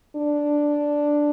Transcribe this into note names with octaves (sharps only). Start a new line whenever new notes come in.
D4